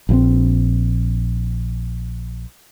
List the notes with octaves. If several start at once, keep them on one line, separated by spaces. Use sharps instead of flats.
A#1 F3 C4